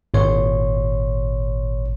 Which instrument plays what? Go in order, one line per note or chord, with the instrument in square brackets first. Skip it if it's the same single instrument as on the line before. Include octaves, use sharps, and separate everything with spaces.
[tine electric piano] G#1 A#2 C#5 C6